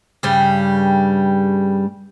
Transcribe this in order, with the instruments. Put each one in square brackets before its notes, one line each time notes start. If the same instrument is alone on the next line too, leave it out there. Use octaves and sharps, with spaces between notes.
[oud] G2 C#3 G3